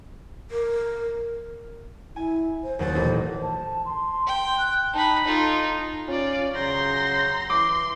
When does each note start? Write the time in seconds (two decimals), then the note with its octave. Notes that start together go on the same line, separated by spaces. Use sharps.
0.51 A#4
2.16 E4 G#5
2.64 C5
2.79 D#2 F#3 C5 A6
2.95 A1 A#2
3.42 A5
3.85 C6
4.27 G5
4.58 F#6
4.94 D#4 A5 B5
5.24 D#4 F4 A4
6.08 C#4 F4 D5
6.55 C#3 F#3 C5 A#5 C6 A#6
7.50 E3 C6 D6